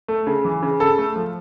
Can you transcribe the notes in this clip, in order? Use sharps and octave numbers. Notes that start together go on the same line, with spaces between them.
A3
C#3
E3
C#3
C#3 A4
A3
F3